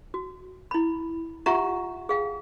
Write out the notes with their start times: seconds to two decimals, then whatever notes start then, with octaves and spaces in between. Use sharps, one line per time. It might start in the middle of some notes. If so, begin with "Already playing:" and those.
0.14 F#4
0.71 E4 B5
1.46 F4 G4 E5 F#5 A#5 C#6
2.09 G#4 F5 G5